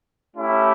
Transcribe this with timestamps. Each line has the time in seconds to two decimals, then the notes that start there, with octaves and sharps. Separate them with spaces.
0.35 A3 C#4 E4 G4